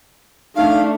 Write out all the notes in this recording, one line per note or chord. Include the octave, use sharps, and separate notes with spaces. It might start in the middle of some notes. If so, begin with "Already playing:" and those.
A3 D4 D#4 F5